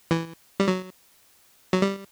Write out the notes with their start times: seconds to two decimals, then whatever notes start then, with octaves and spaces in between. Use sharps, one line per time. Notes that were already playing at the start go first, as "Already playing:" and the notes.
0.11 E3
0.60 G3
0.68 F#3
1.73 F#3
1.82 G3